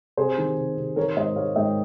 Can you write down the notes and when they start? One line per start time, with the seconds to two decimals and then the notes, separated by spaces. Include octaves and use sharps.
0.17 C3 G#4 C5
0.38 D#3
0.58 C3
0.77 C3
0.96 D#3 A#4 C#5
1.16 G#2 C5 D#5
1.36 G#3 C#5 F5
1.56 G#2 D#5 G5